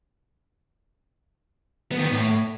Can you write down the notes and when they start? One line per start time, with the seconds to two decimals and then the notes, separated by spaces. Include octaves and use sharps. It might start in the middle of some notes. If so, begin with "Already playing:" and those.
1.92 B3
1.98 D#3
2.05 B3
2.11 A2